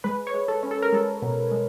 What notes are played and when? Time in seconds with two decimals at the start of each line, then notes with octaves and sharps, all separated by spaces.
0.04 G#3 B4
0.27 C#5
0.34 G#3
0.48 A4
0.63 C#4
0.71 A4
0.82 A#4
0.93 G#3 A4
1.22 B2
1.52 G#3